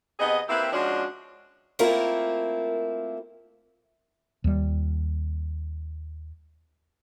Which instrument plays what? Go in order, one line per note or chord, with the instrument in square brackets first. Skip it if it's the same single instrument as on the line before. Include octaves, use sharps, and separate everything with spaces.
[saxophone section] C3 B3 G#4 D#5
A#3 C4 E4 G4 B4 E5
F3 G#3 C#4 D4 F#4
[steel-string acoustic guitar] A3 A#3 C4 E4 F4 A#4
[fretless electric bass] D#2 G3